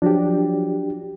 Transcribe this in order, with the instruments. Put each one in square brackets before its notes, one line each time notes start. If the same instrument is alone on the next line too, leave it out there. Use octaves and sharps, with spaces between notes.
[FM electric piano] F3 F#3 [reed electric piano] D4 G4